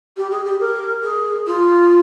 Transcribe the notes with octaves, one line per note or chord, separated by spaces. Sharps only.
G4
G#4
G4
A#4
G#4
F4